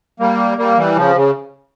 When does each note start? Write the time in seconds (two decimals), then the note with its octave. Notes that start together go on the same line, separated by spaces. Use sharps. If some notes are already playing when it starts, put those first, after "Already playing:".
0.20 G3 A#3
0.58 G3 A#3
0.77 E3 G3
0.96 C#3 F3
1.15 C#3